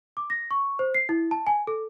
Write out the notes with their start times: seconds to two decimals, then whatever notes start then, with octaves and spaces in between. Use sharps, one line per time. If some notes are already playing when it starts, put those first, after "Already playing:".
0.17 D6
0.30 A#6
0.51 C#6
0.79 C5
0.94 C7
1.09 E4
1.31 A5
1.47 G#5
1.67 A4